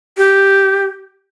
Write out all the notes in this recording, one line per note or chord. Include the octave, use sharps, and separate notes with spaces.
G4